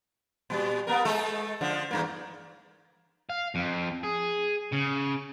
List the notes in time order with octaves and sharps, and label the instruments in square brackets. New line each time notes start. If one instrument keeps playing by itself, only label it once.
[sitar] A#2 G3
A#3 B3 A#4
G#3 A3 A4
D3 F3
E2 G2 A#3
[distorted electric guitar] F5
F2
G#4
C#3